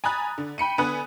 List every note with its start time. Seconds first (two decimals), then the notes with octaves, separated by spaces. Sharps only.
0.04 G#5 A#5 B5 D#6 F#6 A6
0.38 D3
0.58 G5 B5 C#7 D#7
0.78 D3 B3 B4 G#5 D#6 F#6